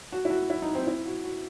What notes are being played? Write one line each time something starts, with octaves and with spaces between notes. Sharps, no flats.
F#4
E4
F#4
E4
D#4
C4
E4
F#4
F#4